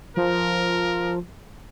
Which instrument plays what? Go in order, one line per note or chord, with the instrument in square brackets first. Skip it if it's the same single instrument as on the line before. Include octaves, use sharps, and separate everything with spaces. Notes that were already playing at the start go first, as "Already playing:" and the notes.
[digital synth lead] F3 [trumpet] A#4